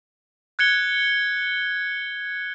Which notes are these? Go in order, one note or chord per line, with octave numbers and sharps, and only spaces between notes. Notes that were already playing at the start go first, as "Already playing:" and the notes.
F#6 G#6 C#7 G7